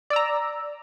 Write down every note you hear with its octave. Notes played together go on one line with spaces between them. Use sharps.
D5 A#5 E6